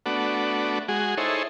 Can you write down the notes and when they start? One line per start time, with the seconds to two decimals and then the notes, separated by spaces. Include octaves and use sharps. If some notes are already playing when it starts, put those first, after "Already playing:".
0.06 A3 B3 D4 F#4
0.88 G#3 F#4 G#4
1.17 D#4 E4 G#4 A4 C5 C#5